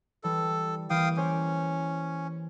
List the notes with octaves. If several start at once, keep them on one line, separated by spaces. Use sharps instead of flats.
E3 G3 A4
E3 A#3 F5 G5 D#6
C#4 C5 D6